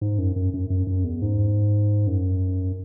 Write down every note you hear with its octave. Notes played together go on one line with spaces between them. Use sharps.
G#2
F#2
F#2
F#2
F#2
F#2
E2
G#2
F#2